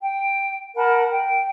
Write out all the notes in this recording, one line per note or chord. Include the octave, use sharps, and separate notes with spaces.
G5
A#4 F#5 A5 B5
G5